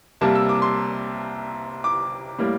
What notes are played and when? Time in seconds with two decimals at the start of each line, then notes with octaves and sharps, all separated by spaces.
0.21 C2 C3 G3 A#3 A5
0.35 E6
0.49 D6
0.62 C6
1.84 D6
2.39 A2 G3 A#3